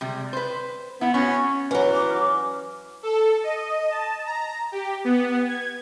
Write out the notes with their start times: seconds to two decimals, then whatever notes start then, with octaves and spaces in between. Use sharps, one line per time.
0.01 C3 G3 G#3
0.33 B4 C5
1.01 B3 E4
1.14 B3 C#4 F#4
1.71 E3 F#3 C#4 F#4 B4 D5
1.94 D6
2.10 F6
3.03 A4
3.43 D#5
3.91 A5
4.26 A#5
4.72 G4
5.04 B3
5.47 G#6